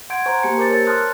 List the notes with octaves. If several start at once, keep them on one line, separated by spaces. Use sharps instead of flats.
F#5 C6 G6 G#6 D7
C5 G#5 A#5 C6 C#6
A#3 G4 A5 C#7
A#4 C5 D6 G6 A6 C#7
A#4 C#5 A5 A6
A5 C6 D#6 F6 F#6 A6